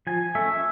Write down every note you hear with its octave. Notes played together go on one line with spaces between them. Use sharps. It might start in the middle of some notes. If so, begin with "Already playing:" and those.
F3 G#5
A3 C#4 E5